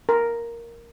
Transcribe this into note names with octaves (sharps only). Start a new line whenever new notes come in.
A#4